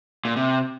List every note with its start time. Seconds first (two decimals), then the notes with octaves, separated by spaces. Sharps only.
0.25 A#2
0.36 C3